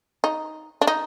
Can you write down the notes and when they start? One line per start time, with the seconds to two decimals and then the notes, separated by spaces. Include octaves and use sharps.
0.24 D#4
0.81 D4
0.87 D#4